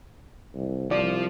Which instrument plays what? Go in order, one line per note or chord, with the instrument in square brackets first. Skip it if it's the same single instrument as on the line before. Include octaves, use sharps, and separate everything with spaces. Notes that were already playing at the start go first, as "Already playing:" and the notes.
[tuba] C2
[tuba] C2 [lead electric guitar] F3 F4 [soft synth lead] D5